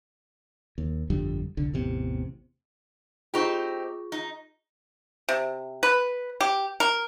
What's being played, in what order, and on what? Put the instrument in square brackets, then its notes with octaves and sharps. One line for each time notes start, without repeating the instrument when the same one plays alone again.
[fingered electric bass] D#2
G1 F2 D3 G3
F1 C2 D3
A1 E2 C3
[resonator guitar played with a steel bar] C4 D#4 G4 [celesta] F4 G#4 C#6
[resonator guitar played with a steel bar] D#4
[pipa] C3
B4
G4
A#4